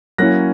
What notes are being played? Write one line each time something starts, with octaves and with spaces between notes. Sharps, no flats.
F#3 A#3 C#4 E4 F#6 A#6